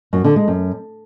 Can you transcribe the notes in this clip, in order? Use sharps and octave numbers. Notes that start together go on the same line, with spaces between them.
F#2
D3
G#3
F#2